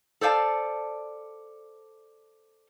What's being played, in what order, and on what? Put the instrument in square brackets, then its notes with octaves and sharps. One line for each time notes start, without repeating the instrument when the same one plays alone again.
[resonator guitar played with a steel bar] A4 C5 D5 F5 A5